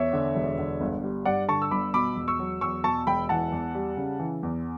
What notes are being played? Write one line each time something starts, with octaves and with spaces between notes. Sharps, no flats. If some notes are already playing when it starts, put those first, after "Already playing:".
Already playing: E2 C#5 E5
D3
E1
D3
G1
G3
G2 D5 F#5
D3 A5 C#6
E6
G1 B5 D6
B2 B5 D6
E1
C#6 E6
F#3
E2 C#6 E6
B2 A5 C#6
E1 G5 B5
E3 F#5 A5
E2
G3
C#3
E3
E2